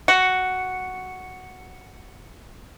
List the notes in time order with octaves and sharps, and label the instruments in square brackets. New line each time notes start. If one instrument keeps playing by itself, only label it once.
[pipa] F#4 [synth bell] C#7